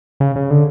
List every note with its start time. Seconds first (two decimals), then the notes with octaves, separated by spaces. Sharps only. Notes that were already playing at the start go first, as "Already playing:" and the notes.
0.20 C#3
0.36 C#3
0.50 D3